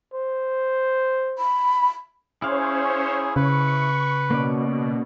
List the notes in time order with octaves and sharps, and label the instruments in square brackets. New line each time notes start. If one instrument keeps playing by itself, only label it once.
[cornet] C5
[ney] B5
[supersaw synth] C#4 C5 C#5 [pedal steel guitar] E4 F5 [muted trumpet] G#4
[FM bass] C#3 [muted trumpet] B4 [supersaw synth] C#6
[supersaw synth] B2 [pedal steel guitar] A#3 C#4 D5